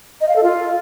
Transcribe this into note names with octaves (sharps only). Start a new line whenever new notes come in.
D#5
F5
A4
F4